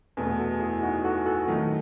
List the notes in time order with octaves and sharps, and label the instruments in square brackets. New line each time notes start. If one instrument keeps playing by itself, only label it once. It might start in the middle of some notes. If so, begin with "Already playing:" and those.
[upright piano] E2 B2 A3 [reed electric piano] G#4 B4
[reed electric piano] F#4 A4
E4 G#4
D#4 F#4
F#4 A4
F#4 A4
[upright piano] D#3 F#3 A3 D#4